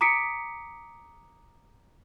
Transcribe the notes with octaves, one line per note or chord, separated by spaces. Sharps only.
A#5 D6 D#6 B6 C#7 D7